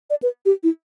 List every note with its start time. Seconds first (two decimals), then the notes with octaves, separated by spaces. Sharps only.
0.10 D5
0.23 B4
0.45 G4
0.63 E4